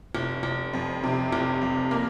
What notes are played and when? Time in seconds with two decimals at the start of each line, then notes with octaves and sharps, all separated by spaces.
0.15 F1
0.43 F1
0.73 F2
1.03 C3
1.32 F1
1.61 F2
1.91 A#3